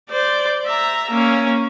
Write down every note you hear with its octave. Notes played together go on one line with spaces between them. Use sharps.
C5 D5
E5 A#5
A#3 C#4